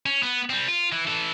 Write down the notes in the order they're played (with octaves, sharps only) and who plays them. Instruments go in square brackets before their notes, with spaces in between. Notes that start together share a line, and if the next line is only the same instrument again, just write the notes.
[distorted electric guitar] C#4
B3
G3 C4
F4
E3
E3 A4